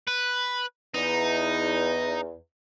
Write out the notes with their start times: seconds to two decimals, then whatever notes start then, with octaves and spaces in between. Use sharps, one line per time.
0.08 B4
0.95 E2 D#4